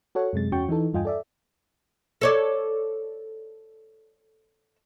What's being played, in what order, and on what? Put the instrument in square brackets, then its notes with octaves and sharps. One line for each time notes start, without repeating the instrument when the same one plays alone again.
[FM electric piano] F#4 A4 C#5 F#5 C#6
F#2 C3 G#3 A6
E2 C#4 F#4 G5 C#6 G6
E3 D#4 A4
E2 G2 F4 D#5 G5 G#5
A4 D5 E5
[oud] A4 C#5 D5